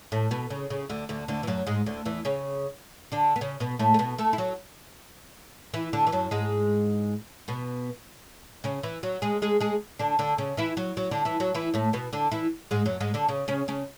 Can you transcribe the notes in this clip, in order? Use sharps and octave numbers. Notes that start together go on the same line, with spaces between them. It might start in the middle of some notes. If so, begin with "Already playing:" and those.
A2 A3
B2 B3
C#3
C#3
D2 D3
D2 D3
D2 D3
E3
F#2 F#3
G#2 G#3
D2 D3
E2 E3
C#3 C#4
D3 D4
B3
C#3 C#4
B2 B3
A2 A3
A3
B2 B3
A3 A4
E4
F#3 F#4
E3 E4
D3 D4
E3
F#2 F#3
G#2 G#3
B2 B3
C#3 C#4
E3 E4
F#3 F#4
G#3 G#4
G#3 G#4
G#3 G#4
D3 D4
D3 D4
C#3 C#4
E3 E4
F#3 F#4
F#3 F#4
D3 D4
E3 E4
F#3 F#4
E3 E4
A2 A3
B2 B3
D3 D4
E3 E4
G#2 G#3
F#2 F#3
G#2 G#3
D3 D4
C#3 C#4
C#3 C#4
C#3 C#4